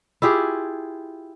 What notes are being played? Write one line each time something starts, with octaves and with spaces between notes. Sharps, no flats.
E4 F4 G4 G#4